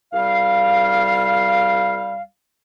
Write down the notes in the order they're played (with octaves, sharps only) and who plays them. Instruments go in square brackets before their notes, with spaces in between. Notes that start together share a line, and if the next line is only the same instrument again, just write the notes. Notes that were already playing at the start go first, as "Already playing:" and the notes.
[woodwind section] C2 G3 F5